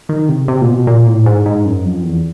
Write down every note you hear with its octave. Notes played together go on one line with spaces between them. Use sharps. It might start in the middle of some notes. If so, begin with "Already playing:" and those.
D#3
C3
C3
A#2
B2
A#2
A2
G#2
G#2
F#2
F2
E2